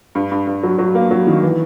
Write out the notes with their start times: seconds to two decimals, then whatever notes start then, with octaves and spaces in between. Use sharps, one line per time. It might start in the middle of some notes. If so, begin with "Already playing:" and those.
0.15 G2
0.31 G2
0.47 G2
0.63 F#3
0.78 F#3
0.95 A#3
1.11 F#3
1.27 D#3
1.42 E3